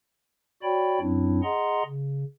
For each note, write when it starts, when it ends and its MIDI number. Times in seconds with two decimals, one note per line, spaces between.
0.63 1.00 66
0.63 1.00 73
0.63 1.00 74
0.63 1.00 79
0.63 1.00 83
1.00 1.40 42
1.00 1.40 54
1.00 1.40 60
1.00 1.40 62
1.00 1.40 64
1.43 1.83 68
1.43 1.83 75
1.43 1.83 78
1.43 1.83 82
1.43 1.83 84
1.85 2.24 49